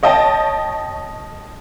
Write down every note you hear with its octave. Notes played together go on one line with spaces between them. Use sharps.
C#5 D#5 G5 A5